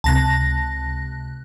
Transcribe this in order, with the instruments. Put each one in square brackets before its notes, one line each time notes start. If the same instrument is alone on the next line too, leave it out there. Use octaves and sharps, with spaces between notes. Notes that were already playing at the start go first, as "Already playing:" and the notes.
[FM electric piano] C#2 C3 F#6 [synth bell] A5 A#6